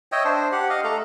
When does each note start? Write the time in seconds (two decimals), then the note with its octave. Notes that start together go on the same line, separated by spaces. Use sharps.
0.12 C#5 D#5 E5 G5
0.24 D4 C5
0.52 G4 F#5
0.70 D#5 F5
0.84 A3 A4 A#5